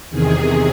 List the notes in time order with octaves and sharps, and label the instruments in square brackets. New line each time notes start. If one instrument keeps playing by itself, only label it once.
[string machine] E2 C3 D#3 G#4